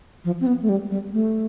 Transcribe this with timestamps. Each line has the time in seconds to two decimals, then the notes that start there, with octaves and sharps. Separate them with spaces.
0.25 F3
0.41 C4
0.46 B3
0.62 A3
0.69 G3
0.91 G3
1.13 A3